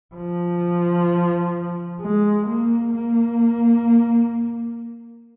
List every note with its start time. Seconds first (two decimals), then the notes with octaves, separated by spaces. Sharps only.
0.15 F3
2.01 G#3
2.47 A#3
2.94 A#3